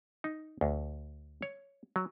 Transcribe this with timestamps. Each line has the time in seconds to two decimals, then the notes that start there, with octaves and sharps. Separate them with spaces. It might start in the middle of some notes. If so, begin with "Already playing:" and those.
0.24 D#4
0.61 D2
1.42 C#5
1.96 F#3